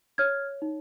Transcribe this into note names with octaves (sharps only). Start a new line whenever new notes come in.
C#5 F6 G#6
D#4